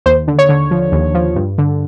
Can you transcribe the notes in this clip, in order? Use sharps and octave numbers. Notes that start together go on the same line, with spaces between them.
D#2 C5
D3
C#5
D3
F3
D#2
F3
G2
D3